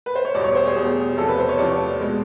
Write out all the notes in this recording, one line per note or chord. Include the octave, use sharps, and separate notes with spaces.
B4
C5
C#5
E2 B2 G3 D5
C#5
C5
G#4
E2 B2 G3
E2 C3 F3 A4
B4
C5
C#5
E2 C3 F3 D5
B2 G#3